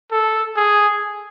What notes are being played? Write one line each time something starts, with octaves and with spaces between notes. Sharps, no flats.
A4
G#4